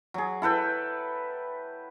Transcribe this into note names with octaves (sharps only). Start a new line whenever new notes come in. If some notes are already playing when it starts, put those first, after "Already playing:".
F#3 G#4
E4 A4 B4 G5